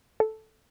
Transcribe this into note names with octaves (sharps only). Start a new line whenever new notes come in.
A4